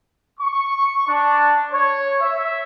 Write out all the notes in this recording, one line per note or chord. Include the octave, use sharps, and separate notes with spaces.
C#6
D4
C#5
E5